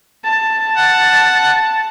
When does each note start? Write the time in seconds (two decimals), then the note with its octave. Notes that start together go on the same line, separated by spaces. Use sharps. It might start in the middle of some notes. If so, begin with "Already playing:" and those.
0.24 A5
0.77 F#5